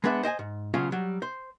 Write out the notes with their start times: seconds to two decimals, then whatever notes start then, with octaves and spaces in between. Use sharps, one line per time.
0.04 G#3 B3 D4 B4 E5
0.23 C5 D#5 G5 G#5
0.39 G#2
0.74 B1 C#3 F#3 F4 G#4 F5
0.92 F#3 G3
1.22 C5